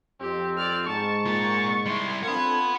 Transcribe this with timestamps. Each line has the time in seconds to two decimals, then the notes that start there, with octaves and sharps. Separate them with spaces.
0.21 F2 C4 G4
0.58 D5 F6
0.87 G#2 A5 C#6
1.26 A#3 F4 A6
1.86 G3 E4 C6
2.23 C4 D4 F4 A4 F#5 B5 G#6